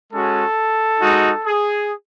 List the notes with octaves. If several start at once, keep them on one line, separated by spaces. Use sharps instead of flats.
G#3 C#4 F#4 A4
G#3 D#4 F#4
G#4